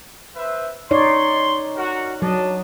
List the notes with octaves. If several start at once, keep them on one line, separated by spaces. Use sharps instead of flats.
B4 C5 E5
D#4 C#5 D5 C6
F#4 A#4 F#5
F#3 D4 D#5 A5